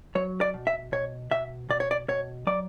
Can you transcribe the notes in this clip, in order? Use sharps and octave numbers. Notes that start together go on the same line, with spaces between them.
F#3 C#5
D5
B2
E5
B2 C#5
B2 E5
B2 D5
C#5
D5
B2 C#5
F#3 D5